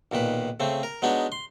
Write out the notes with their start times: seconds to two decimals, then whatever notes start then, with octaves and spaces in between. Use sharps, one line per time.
0.12 B1 A#2 D#3 B4
0.60 C#3 A3 C4
0.83 A#4
1.02 F#3 G#3 B3 D4 D#4
1.32 C6